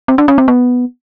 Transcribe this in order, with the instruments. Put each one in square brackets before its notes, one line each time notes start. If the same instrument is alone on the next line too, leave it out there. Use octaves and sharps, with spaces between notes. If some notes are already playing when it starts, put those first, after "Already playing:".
[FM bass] C4
D4
C#4
C4
B3